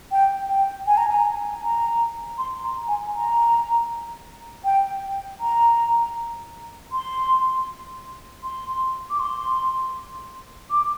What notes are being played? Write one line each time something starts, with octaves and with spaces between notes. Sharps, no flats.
G5
G5
G#5
A#5
G#5
A#5
C6
A#5
G#5
A#5
G5
A#5
C6
C6
D6
C6
D6